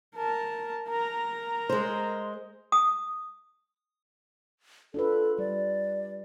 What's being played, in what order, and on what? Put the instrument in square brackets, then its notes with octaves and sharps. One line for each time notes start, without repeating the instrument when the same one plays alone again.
[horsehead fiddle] A#4 A5
A#4 A#5
[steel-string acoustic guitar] G#3 C5
[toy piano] D#6
[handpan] D4 F4 B4 [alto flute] A4
[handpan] G3 [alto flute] D5